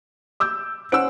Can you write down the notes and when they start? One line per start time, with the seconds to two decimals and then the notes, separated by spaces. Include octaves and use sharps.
0.40 D6 E6 G6
0.92 C#4 C5 F#5 E6 D7